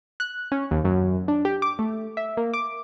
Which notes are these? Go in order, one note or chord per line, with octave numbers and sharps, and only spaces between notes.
F#6
C#4
D#2
F#2
D4
G4
D6
A3
E5
A#3
D6